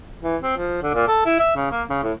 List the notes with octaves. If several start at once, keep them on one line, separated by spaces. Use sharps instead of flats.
E3
C4
F3
D3
A#2
A4
E4
E5
C#3
A#3
C#3
A2